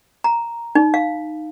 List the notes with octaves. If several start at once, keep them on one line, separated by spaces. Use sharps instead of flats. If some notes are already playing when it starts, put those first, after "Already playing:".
A#5
D#4
F5